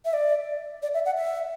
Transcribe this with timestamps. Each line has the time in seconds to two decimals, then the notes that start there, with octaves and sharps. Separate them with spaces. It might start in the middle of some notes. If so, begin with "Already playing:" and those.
0.05 E5
0.13 D5
0.83 D5
0.94 E5
1.06 F#5
1.17 E5